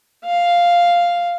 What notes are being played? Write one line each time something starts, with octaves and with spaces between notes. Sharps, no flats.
F5